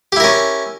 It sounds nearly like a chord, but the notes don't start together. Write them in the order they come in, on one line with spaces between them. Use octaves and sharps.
G4 E4 A#4 C#4